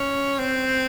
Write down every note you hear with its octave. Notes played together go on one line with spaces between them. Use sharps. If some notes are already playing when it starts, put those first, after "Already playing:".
Already playing: C#4
C4